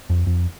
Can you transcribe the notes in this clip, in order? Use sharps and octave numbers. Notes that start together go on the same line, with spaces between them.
F2
F2